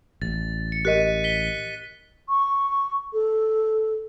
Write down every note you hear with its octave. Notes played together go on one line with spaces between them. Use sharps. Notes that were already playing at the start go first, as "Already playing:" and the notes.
A1 A6
C#7
G4 A#4 D#5 F#6 B6 D#7
B6 G7
C#6
A4